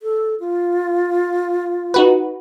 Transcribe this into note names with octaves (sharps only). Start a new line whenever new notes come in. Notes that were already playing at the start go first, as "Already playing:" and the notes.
A4
F4
D#4 F#4 B4